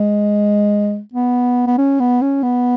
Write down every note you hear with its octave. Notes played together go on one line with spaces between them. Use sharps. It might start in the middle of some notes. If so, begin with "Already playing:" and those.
Already playing: G#3
B3
B3
C#4
B3
C#4
B3